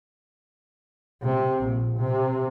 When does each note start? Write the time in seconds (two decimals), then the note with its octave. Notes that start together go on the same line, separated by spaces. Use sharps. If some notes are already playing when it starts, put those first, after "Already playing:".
1.22 C3
1.61 A#1
1.97 C3